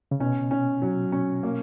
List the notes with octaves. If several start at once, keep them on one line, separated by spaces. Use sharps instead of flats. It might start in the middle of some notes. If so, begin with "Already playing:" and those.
C#3
B2 C#4
C#4
F#3
C#4
A#3